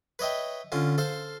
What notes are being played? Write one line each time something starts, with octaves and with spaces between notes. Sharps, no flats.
B4 C#5 D#5 E5 G5
D3 C#4 F4
A4 C5 F5